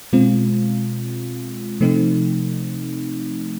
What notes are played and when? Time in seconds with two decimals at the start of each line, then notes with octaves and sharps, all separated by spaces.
0.13 B2 G#3 C4 F4
1.80 C3 F3 A3 C4 D#4